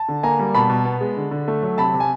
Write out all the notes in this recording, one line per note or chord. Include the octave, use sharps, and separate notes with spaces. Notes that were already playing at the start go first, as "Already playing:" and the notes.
Already playing: A5
D3
A#3 G#5 A#5
G3
B2 A5 B5
B2
B3
G#3
D3
D3
A3
F#3
C3 A5 B5
C3
G#5